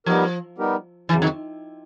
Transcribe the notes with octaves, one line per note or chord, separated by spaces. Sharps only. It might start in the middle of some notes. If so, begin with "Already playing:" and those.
F3 G3 B3 D#4 G4 A#4
G3 B3 D#4 G4 A#4
F2 C#3 E3 F#3
D#3